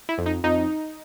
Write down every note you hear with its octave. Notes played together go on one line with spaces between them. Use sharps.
E4
F2
D#4
F2 D#4